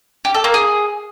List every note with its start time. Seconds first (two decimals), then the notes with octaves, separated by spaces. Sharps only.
0.25 G4
0.34 A4
0.44 A#3
0.54 G#4